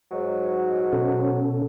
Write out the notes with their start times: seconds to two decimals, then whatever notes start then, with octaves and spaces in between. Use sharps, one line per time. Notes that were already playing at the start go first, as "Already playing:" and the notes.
0.12 G#2 F#3
0.93 B2 C#4 A4